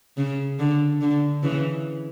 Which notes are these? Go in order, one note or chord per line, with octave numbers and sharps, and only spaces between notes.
C#3
D3
D3
C#3 E3